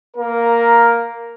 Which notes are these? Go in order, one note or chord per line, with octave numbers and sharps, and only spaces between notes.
A#3 A#4